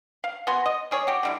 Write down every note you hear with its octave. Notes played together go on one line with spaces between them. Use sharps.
F5
B3 F#4 G#5 C6
D#5
G3 G#4 C#5
F#4 G4
D3 G3 E4